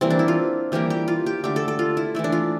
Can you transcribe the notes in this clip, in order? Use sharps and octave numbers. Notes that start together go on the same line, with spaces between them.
E3 G3 A#3 C4
D4
E4
F4
E3 G3 A#3 G4
G4
F4
G4
D3 A3 G4
A4
A4
F4
E4
E3 A3 E4
D4
F4